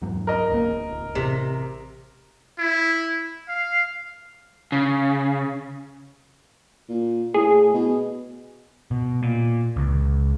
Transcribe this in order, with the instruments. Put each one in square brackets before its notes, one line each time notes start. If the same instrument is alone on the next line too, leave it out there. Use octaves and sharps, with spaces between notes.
[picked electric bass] E2 G#2 F#3
[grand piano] A#4 D#5
[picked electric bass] D1 A1 A#3
D1
[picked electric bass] A1 [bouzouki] C3
[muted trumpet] E4
F5
[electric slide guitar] C#3
[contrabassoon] A#2
[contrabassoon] A2 [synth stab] G#4
[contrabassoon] B2
[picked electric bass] B2
A#2
C#2